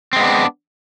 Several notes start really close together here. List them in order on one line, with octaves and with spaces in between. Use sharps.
C4 G#3 B3 D4